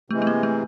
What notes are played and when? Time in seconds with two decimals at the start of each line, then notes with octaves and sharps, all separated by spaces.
0.10 C3 E3 G#3 A3
0.22 A3
0.27 A#3
0.43 A3